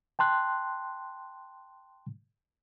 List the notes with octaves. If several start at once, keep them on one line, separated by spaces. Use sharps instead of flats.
G5 A5 C6 F#6